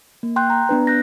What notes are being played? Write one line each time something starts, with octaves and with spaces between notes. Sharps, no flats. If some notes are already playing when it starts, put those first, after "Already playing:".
A#3
G5 C6 F#6 G6
A#5
B3 D4 B4
F#6 G6 A#6